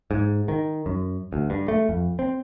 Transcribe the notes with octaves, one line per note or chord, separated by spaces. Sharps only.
G#2
D#3
F#2
D2
G2
A3
F2
C4